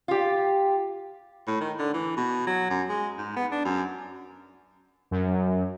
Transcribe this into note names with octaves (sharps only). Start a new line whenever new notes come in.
F4 G4
A2
D#3
D3
E3
B2
F#3
F#2
G#3
G#2
B3
D4
F#2
F#2